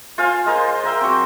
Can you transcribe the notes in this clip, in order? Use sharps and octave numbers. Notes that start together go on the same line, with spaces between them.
F4 C5 F5 G#5
G#3 A#4 C5
G#4 A#4 E5 G5
F#3 C4